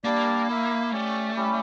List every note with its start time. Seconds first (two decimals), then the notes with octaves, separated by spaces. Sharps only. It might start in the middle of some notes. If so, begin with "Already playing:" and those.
0.04 G3 A#3 D4 G4 D5
0.48 E4 A#4 E5
0.92 A3 C#4 G4 D5
1.36 G3 C#4 E4 G4